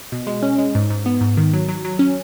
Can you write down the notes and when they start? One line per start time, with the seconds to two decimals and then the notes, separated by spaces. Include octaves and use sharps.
0.12 B2
0.27 G#3
0.42 C#4
0.58 G#3
0.75 G#2
0.90 G#2
1.06 B3
1.21 G#2
1.37 D#3
1.53 F#3
1.68 F#3
1.85 F#3
1.99 C#4